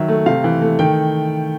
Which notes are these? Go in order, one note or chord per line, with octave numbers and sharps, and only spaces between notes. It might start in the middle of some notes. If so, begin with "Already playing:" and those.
Already playing: D#3 F#3 E5
A3
C3 F5
E3
A3
D#3 G5